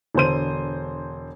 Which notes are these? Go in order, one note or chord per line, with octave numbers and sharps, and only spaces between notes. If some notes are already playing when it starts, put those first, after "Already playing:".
E1 D3 C5 D#7